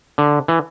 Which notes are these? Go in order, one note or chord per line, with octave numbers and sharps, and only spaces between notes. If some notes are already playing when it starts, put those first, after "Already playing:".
D3
E3